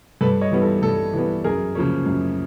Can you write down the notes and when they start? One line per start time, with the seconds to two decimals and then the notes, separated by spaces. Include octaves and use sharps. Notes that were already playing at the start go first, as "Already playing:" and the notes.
0.21 G2 A4 B4
0.41 C#5 D#5
0.51 E3 G3 B3
0.62 A4
0.82 G2 A4
1.13 E3 G3 B3
1.44 F#2 G#4 A#4
1.75 C#3 F3 A#3 C#4
2.06 F#2